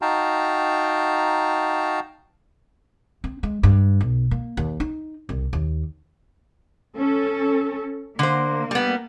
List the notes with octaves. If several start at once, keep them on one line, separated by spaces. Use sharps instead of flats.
D#4 F#4 F5 G5 A5 A#5
C4
G#3
G2
B1
A#3
D#2
D#4
C2
D#2
C#4 A4
D3 A#3 C5
G3 B3